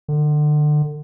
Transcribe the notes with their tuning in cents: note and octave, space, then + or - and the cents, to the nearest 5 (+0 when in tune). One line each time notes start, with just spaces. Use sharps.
D3 +30